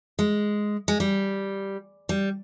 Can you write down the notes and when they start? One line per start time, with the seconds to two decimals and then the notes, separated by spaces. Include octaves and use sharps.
0.19 G#3
0.88 G#3
1.00 G3
2.09 G3